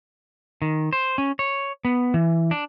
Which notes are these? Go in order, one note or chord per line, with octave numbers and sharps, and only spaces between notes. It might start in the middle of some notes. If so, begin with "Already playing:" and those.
D#3
C5
C#4
C#5
B3
E3
D4